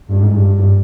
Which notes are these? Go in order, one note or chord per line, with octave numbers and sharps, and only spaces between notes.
G2
G#2
G2
G2